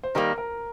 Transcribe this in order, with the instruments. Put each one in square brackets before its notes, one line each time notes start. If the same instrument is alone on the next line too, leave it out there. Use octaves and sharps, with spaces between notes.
[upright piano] C5
[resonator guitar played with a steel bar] D#3 G3 A#3 [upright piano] A#4
[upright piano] A#4